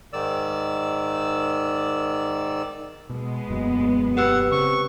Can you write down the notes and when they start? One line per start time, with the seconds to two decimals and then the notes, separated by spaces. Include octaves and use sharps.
0.13 G#2 D#3 D5 E6
3.10 B2 G#3 B3
3.49 E1 F#2 A#2
4.17 G4 B4 F#5 E6
4.52 C#3 C4 C#6